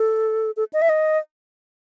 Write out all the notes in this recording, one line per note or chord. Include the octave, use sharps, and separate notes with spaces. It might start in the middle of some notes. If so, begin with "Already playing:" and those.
Already playing: A4
A4
D#5
E5
D#5